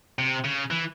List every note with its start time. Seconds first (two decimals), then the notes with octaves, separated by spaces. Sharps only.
0.19 C3
0.44 C#3
0.71 E3